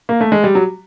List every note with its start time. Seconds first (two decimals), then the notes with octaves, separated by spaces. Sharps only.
0.09 A#3
0.21 A3
0.32 G#3
0.44 G3
0.55 F#3